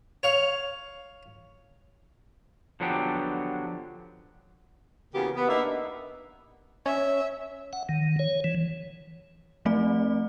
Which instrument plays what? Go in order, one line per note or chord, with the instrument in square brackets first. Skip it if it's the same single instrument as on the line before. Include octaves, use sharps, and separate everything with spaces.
[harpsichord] C#5 F5
[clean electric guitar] D3 F3 F#3 B3 D4 G4
[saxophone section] C#3 E3 A#3 B3 F#4 G4
B3
A#3 B3 D4 D#4 E5
[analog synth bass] C#4 [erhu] E5
[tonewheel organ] F#5
D#3
C#5
E3
[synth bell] F3 A3 C4 D5